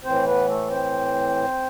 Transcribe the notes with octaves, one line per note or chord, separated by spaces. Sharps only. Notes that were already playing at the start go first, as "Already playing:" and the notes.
A2 E3 C4 C5
B3 B4
A3 A4
C4 C5